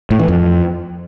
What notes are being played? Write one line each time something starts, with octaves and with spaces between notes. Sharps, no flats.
A2
E3
F2